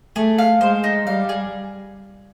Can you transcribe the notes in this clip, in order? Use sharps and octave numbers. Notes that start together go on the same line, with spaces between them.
A3 G#4
F5
G#3 C5
D#4
G3 F5
G#4